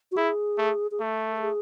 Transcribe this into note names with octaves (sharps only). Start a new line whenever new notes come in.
F#4
E4 G#4
A3
G#4
A3 A4
A4
G#4